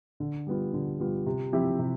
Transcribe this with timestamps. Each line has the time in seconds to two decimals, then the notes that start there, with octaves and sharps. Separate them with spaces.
0.20 D3
0.47 G3 B3 F4
0.73 D3
1.00 G3 B3 F4
1.26 C3
1.52 F3 C4 E4 G4
1.79 C3